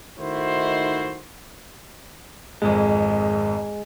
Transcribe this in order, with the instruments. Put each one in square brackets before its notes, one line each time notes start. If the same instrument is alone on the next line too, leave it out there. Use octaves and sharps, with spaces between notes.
[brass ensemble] D#3 A3 D#4 E4 F#4 C5
[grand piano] G#1 F2 G#2 [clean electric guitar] G#3